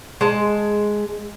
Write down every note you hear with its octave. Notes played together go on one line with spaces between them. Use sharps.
G#3 A5